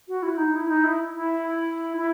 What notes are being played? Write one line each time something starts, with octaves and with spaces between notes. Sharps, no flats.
F#4
E4
D#4
E4
D#4
E4
E4
E4